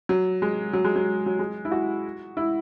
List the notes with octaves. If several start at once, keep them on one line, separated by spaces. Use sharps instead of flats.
F#3
G#3
F#3
G#3
F#3
F#3
G#3
E4
F#4
E4